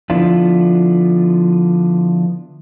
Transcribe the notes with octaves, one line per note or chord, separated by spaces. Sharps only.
D3 F3 B3 D4 E4 F4